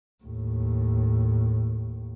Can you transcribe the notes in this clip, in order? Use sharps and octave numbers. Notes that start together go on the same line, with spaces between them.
D#2 A2